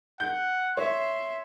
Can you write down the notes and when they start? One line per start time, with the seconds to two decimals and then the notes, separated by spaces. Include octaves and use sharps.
0.20 F#5 G6
0.77 C#5 E5 C6